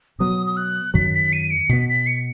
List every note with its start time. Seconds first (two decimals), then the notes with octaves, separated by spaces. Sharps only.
0.19 B2 F#3 B3 D#6
0.46 D#6
0.57 F#6
0.94 F#2 D#3 F#3 B6
1.14 B6
1.33 D#7
1.50 C#7
1.69 B2 B3 B6
1.89 B6
2.07 C#7